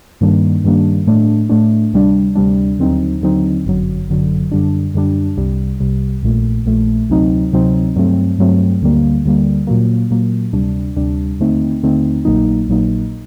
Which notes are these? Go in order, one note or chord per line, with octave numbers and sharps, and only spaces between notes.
G2 D#3 G3 A#3 D4
G2 D#3 G3 A#3 D4
A2 A3 D4
A2 A3 D4
D2 C3 G3 D4
D2 C3 G3 D4
D#2 D3 F#3 C4 D#4
D#2 D3 F#3 C4 D#4
G1 F#2 D3 F#3
G1 F#2 D3 F#3
F#2 D3 G3 D4
F#2 D3 G3 D4
C2 C3 G3
C2 C3 G3
A#1 A#2 A3
A#1 A#2 A3
D2 C3 F#3 C4 D#4
D2 C3 F#3 C4 D#4
G2 F#3 A3 C4
G2 F#3 A3 C4
D2 D3 G3 A#3
D2 D3 G3 A#3
A#2 F#3 A#3
A#2 F#3 A#3
D2 C3 G3 D4
D2 C3 G3 D4
D#2 D3 A3 C4 D#4
D#2 D3 A3 C4 D#4
A#1 A#2 F#3 A#3 D#4
A#1 A#2 F#3 A#3 D#4